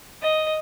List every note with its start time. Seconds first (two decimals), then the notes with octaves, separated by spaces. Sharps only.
0.22 D#5